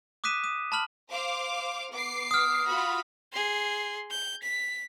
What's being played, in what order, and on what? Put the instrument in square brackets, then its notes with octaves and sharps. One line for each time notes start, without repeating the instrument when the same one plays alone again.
[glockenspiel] D6 D#6 F#6 B6 D#7 E7
D#6
A5 B5 F6 F#7
[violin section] C5 F5 D6
B3 D6 C7
[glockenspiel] D#6 F6
[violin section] F4 F#4 B5
[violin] G#4 C6
G6
B6